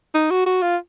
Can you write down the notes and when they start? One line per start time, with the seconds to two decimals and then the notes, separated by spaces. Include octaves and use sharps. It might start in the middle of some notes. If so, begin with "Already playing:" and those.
0.14 D#4
0.31 F#4
0.46 F#4
0.62 F4